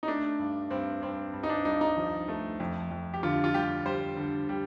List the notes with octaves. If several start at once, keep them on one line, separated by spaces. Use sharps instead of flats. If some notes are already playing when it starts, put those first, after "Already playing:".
D#4
A3 D4
G2
G2 C4
G2 C4
G2
D#4
D4
G2 D#4
D#4
F3
A3
F2
F2
G4
D3 F4
F4
G3 G4
G3 C5
D3
G3